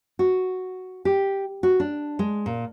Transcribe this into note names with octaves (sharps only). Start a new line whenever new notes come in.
F#4
G4
F#4
D4
G#3
A#2